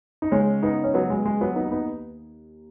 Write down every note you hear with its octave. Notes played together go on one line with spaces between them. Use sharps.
D#4
C#2 C#3 G#3 C#4
B3 D#4
C#4
F#3 B3
G#3
G#3
F#3 B3
D#2 D#3 B3 D#4
B3 D#4